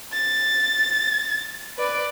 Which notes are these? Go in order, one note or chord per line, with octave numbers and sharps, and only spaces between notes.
A6
B4 D5